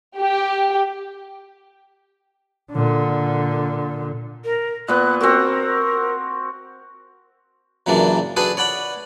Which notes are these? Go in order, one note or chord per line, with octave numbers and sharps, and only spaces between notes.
G4
A#2 D3
A#4
A#2 B3 F#6
C4 F#4 A#4
F#2 A#2 C#3 E3 F#3 D4
D4 F#4 G#4 A4 B4
C#5 D5 F#5 B5 D6